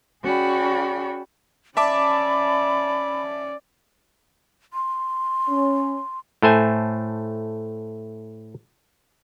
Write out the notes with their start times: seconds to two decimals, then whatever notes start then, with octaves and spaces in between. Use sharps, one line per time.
0.23 C#4 F#4 G#4 D5 G5 B5
1.77 C#4 D5 E5 A5 B5 D6
4.73 C6
5.49 C#4
6.42 A2 A3 C5 G#5